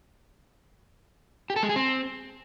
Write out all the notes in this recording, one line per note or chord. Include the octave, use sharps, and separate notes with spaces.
G4
A4
G#3
G#4
C4